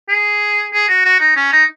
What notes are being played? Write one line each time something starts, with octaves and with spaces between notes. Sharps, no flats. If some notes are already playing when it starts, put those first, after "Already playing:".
G#4
G#4
F#4
F#4
D#4
C#4
D#4